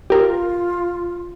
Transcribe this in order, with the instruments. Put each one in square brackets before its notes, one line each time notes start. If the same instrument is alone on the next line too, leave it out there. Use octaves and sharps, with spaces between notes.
[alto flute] F4 [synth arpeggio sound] G4 A#4